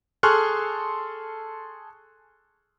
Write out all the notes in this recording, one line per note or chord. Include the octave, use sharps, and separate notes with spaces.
G#4 A4 C6 C#6 F6 F#6